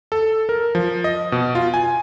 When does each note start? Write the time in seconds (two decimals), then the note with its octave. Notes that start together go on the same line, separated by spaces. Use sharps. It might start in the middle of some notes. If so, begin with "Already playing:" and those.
0.12 A4
0.49 A#4
0.75 F3
1.04 D#5
1.32 B2
1.55 F4
1.74 G#5